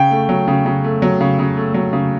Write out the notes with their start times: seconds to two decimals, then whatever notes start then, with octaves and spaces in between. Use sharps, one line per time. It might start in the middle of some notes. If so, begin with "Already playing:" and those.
Already playing: C#3 G5
0.11 A3
0.29 F#3
0.48 C#3
0.66 C#3
0.84 A3
1.02 F#3
1.21 C#3
1.39 C#3
1.57 A3
1.74 F#3
1.93 C#3